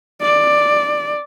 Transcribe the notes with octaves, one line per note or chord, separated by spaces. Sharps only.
D5